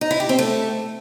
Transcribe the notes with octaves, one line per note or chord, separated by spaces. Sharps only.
D#4
E4
G4
C4
A3